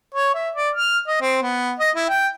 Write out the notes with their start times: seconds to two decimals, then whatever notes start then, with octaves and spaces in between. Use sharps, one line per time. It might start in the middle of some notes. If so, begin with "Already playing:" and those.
0.14 C#5
0.34 E5
0.55 D5
0.75 F6
1.07 D#5
1.21 C4
1.42 B3
1.79 D#5
1.96 E4
2.09 G5